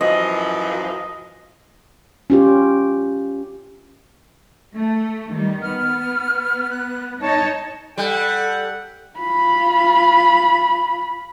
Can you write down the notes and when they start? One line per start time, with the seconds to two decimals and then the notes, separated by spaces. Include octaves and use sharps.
0.01 F#2 E3 F3 D#5
2.30 C#4 F4 G4
4.77 A3
5.31 D#3 G3
5.62 B3 F6
6.71 F#6
7.21 D#4 C#5 A5
7.98 G3 A4 F#5
9.19 F4 B5